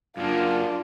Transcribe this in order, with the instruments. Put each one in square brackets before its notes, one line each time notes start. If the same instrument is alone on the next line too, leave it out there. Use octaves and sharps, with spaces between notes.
[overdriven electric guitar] F#2 A#3 [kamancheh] D4 F4